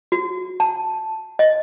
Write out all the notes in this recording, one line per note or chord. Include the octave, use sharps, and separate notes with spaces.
F#4
A5
D#5